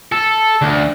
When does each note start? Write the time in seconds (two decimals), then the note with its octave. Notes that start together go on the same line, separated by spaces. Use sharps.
0.12 A4
0.61 D2